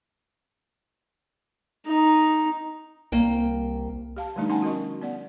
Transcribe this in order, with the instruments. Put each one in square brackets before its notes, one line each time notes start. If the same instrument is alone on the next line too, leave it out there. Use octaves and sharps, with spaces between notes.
[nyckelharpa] D#4
[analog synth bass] C2 [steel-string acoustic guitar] A#3 G5
[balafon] G4 F5 A5
D3 F3 G3 A3 D4 D#4
C#4 D#4 F#5 G#5 A5
F#4 A#4 D#5 C#6
B3 D5 F#5